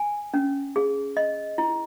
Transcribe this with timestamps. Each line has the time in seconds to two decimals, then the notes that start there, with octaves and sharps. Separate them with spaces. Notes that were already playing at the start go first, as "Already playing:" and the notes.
Already playing: G#5
0.34 C#4
0.76 G#4
1.17 D#5
1.58 E4